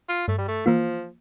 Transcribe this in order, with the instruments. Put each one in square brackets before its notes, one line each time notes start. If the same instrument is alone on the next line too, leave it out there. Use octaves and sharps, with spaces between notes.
[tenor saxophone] F4
[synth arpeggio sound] G2 [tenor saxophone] A3
[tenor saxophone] G3
A3
[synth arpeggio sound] E3 A#3 F4 [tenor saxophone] F3